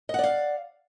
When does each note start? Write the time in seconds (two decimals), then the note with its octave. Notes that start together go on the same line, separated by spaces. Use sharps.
0.09 D#5
0.14 F#5
0.19 D5
0.23 F5